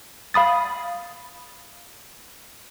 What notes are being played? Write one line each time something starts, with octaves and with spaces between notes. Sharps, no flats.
F5 B5 D#6 A6